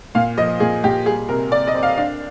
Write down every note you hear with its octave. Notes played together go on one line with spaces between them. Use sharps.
A#2 F5
F3 D#5
A#2 G#4
A#2 G4
G3 G#4
C3 A#4
C3 D5
D#5
C4
F5
D4 F5